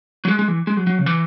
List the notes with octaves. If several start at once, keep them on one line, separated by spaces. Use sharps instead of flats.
F#3
G#3
G#3
E3
G#3
F#3
F#3
C#3
E3